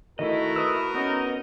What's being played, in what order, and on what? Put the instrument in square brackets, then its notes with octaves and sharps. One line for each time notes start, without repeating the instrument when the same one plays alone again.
[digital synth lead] D#3 [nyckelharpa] A3 E4 [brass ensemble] F#4 A#4 [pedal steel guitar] D#5
[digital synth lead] B4 [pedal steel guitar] D#6 E6
[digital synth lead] B3 [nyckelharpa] C#4 D#5 [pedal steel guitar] D#4